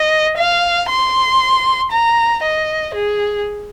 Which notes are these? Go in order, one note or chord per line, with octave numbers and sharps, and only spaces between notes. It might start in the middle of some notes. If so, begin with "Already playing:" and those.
Already playing: D#5
F5
C6
A#5
D#5
G#4